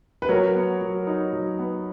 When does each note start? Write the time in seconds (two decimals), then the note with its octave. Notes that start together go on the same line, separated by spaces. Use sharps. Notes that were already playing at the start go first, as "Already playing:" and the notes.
0.22 B4
0.29 F#3 A#4 C#5
0.55 B3
0.81 F#3
1.07 D#4
1.33 F#3
1.59 B3